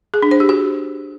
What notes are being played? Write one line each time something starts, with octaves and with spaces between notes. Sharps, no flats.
G#4
D4
C5
G4
F#4